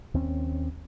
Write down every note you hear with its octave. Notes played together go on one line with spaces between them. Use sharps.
D#2 C4 C#4